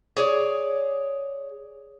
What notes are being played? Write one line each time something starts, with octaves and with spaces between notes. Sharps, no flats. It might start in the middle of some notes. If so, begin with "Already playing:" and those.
G#4 C#5 D5